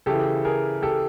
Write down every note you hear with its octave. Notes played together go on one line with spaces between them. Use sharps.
C#3 E3 G4 A4
G#4 A#4
G4 A4